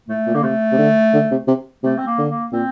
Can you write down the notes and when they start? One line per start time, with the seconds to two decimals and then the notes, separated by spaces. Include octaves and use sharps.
0.08 A2 A3
0.26 A#2
0.34 D3 A#3
0.43 C3 A3
0.72 C3
0.78 D3
1.14 D3
1.31 C3
1.48 C3
1.83 C3 A3
1.98 C4
2.07 A#3
2.18 D3
2.29 A#3
2.52 A#2 C4